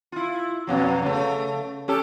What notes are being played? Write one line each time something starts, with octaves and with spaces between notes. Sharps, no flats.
E4 F4
F2 B2 F#3
C#3 A3
C#4 G4 A4